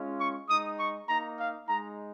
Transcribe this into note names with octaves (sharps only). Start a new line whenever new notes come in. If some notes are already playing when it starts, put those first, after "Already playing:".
Already playing: G#3 C#4 F4
C#6
G#3 D#4 D#6
C#6
A#3 D#4 A#5
F5
G#3 D#4 A#5